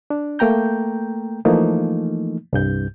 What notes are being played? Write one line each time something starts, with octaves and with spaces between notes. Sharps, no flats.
D4
A3 A#3 G5 A#5 G6
E3 F3 A3 A#3 D#4
C2 G2 G6